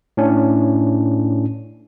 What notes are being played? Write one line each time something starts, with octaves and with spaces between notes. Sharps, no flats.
A2 C#4 D4